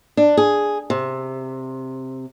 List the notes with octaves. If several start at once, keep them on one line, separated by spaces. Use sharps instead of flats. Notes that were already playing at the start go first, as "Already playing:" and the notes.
D4
G#4
C3